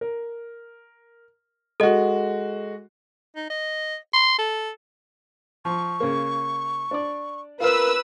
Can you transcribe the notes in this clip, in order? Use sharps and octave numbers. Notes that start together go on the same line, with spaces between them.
A#4
G#3 F#4 A4 D#5
D#4
D#5
C6
A4
F3 C#6
C#3 A#3
D4 D5
F4 A#4 B4 F5 E6